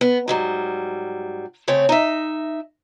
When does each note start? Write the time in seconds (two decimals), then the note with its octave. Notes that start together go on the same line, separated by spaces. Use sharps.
0.01 B3
0.28 G#2 F#3 G3
1.68 C#3 A3 C4 C#5
1.89 D#4 E5